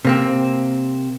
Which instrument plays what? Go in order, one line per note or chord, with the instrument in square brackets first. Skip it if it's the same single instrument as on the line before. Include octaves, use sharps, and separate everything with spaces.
[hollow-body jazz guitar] C3 A#3 C4